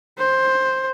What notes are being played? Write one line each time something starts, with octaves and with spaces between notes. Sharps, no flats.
C5